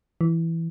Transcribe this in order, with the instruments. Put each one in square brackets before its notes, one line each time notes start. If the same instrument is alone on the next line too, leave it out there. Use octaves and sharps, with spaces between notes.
[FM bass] E3